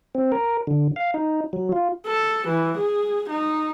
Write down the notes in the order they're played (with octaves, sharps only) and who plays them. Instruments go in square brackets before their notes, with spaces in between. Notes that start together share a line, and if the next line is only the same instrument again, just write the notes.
[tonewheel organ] C4
A#4
D3
F5
D#4
F#3
F4
[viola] A4
E3
G#4
D#4